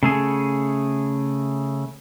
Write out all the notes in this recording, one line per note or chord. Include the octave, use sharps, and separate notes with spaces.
C#3 A3 G#4